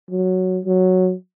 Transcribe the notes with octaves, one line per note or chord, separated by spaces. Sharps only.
F#3
F#3